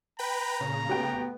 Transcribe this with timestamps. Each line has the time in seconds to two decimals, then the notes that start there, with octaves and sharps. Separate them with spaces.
0.19 B4 G5 A#5 B5
0.60 A#2 C#3
0.89 A3 B3 F#4 G4 G5